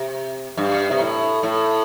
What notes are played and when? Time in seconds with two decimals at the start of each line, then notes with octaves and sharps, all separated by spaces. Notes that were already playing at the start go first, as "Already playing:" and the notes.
Already playing: C3
0.57 G2
0.91 C3
1.00 A2
1.43 A2